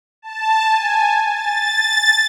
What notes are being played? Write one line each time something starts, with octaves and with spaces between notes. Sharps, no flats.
A5
G#5
A6